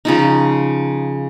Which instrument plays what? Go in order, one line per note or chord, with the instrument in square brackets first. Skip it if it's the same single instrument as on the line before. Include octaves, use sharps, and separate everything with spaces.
[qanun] C#3 F3 D#4